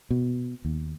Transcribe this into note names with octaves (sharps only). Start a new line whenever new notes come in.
B2
D#2